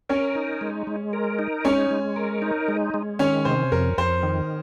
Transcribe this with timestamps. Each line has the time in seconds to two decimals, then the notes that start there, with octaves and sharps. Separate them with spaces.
0.09 C#4 A#4 C#5
0.35 D#4
0.61 G#3
0.87 G#3
1.13 A#4
1.39 D#4
1.64 G#3 C#4 C#5
1.91 G#3
2.16 A#4
2.42 D#4
2.68 G#3
2.94 G#3
3.19 D#3 C#4 C#5
3.45 C3 C5
3.72 F2 A#4
3.98 F2 C5
4.23 D#3